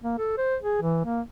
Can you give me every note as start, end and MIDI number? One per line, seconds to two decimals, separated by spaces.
0.02 0.17 58
0.18 0.33 69
0.37 0.56 72
0.62 0.79 68
0.82 1.01 52
1.05 1.21 58